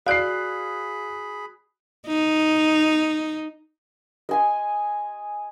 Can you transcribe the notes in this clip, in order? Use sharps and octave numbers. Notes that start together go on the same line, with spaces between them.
F#4 G#4 D5 F5 B5 F#6 C7
D#4
D#5 G#5 C6